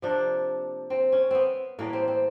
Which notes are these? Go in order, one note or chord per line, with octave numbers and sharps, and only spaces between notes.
C3 F3 A#3 D4
C4
C#4
B3 C4
A2 E3 G3 A#3
C4
C4